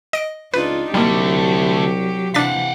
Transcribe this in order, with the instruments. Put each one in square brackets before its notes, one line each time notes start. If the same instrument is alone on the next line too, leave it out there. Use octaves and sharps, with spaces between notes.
[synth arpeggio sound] D#5 D7
[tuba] C#2 [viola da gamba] D4 D#4 F4 [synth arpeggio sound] B4
[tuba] C2 [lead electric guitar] D3 A3 [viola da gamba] F#3 G4 [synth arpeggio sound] G3 A#3
[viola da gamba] C3 E3 [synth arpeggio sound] D4 A6 B6 [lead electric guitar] F5 F#5